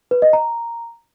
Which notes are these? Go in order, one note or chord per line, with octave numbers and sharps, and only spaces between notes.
B4
D#5
A#5